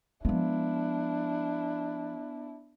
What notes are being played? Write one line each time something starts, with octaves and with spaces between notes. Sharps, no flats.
F3 G#3 B3 D4 E4